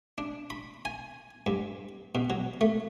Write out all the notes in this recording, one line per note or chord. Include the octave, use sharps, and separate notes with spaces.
D4
B5
G#5
G2
B2
F#3
A3